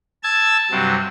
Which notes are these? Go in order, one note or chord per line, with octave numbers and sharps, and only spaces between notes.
A5 E6 G#6
G2 C3 F#3